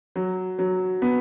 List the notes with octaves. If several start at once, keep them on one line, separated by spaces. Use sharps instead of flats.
F#3
F#3
B3